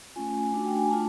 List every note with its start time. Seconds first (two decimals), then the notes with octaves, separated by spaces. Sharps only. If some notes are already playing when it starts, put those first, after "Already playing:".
0.16 A3 C#4 F4 G#5
0.53 A3 D4 F#4
0.66 G5
0.77 G#5
0.89 A3 D4 F4 A5